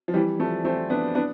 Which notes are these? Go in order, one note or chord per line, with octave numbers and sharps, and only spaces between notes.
F3
E3 G3
F3 A3
A3 C4
B3 D4
B3 D4